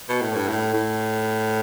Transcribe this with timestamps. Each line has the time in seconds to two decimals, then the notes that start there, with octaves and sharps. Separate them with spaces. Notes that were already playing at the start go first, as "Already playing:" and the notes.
0.09 B2
0.22 A2
0.35 G2
0.48 A2
0.74 A2